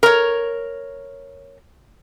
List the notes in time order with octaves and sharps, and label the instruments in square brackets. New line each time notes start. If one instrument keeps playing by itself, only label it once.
[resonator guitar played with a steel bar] A#4 C#5